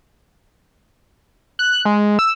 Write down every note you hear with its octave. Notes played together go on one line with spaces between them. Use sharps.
F#6
G#3
E6